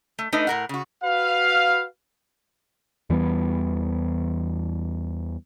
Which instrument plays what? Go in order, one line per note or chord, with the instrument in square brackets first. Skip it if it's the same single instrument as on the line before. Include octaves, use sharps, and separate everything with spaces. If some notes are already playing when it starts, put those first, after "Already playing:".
[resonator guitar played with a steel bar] A3
A3 D4 D#4 B4 D#5
A2 A#4 F#5
C#3 F#4
[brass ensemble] F#4 B4 F5
[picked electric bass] E2 E3 G3 B3